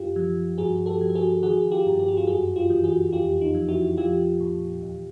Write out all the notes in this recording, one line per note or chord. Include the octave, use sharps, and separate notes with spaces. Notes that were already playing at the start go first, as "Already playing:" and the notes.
Already playing: F#2 F4 G4
F3
G2 F#4 G#4
G4 A4
F3
A4
F#4 G#4
D#3 F#4 G#4
F4 G4
G2
G4
F#4
F4 G4
F#2 F#4 G#4
F4 G4
E3
F#4 G#4
F2 F4 G4
D#4 F4
F3
E4 F#4
F3 F4 G4
A#2
E2